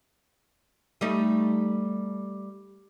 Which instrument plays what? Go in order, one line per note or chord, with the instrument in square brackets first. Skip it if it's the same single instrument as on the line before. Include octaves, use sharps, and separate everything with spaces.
[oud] G3 A3 D#4